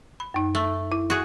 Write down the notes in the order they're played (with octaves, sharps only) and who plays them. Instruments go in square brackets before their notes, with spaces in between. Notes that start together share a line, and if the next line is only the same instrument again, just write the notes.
[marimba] B5
F#2 D#4
[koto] A3
[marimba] E4
[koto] F#4 G#4